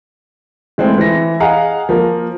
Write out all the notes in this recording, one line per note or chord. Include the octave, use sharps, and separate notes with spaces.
E3 G#3 A3 C4
E3 A#6
G#4 D#5 F5 F#5 A#5
F3 A#3 A#4